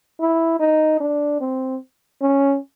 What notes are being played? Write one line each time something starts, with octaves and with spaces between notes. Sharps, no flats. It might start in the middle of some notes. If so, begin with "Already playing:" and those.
E4
D#4
D4
C4
C#4